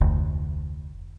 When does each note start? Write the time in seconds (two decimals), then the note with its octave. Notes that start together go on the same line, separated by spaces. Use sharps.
0.01 F1 D2